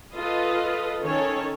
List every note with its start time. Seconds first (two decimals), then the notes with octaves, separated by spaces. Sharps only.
0.13 F4 A4 B4 D#5
1.03 D#3 C#4 A4 C#5